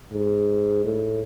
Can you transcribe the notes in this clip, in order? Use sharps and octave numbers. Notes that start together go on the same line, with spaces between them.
G#2
A2